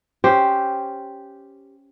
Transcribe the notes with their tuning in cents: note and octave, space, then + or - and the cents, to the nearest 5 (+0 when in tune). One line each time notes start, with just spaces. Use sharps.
C#4 +0 G4 +0 C5 +0